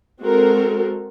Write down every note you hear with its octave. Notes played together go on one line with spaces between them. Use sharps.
G#3 C4 F#4 A4 A#4